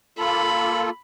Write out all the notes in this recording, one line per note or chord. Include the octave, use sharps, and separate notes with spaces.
A#3 F4 A4 B5